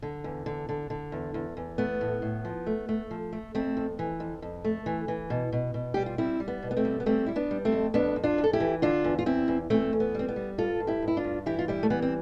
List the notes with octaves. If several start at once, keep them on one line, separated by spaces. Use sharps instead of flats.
D3
E2
D3
D3
D3
E2
E2
E2
A3 B3
A2
A2
F3
A3
A3
F3
A3
F2 A3 C4
F2
E3
F2
F2
A3
E3
E3
B2
B2
B2
G3 G4
F4
G3 C4 E4
G3
B3
B2
B3
A3 C4
G3
B3
G3 A3 C4
G3 E4
B3 D4
G3
A3 C4
F2
F2 B3 D4
F2
D4 F4
F2
A4
E4 G4
E3
D3 D4 F4
E2
F4
E2 C4 E4
E2
E2 A3 C4
E2
B3
G3 C4
B3
G3
G2 F4 A4
G2
E4 G4
G2
E4
D4 F4
G2
E3 E4 G4
F4
G3 E4 G4
A3
E3 B3
C4